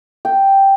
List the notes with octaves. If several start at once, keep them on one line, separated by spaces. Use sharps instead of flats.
G5